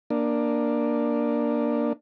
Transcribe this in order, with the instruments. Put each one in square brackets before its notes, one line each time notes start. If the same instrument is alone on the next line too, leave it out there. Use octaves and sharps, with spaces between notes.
[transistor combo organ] A#3 D4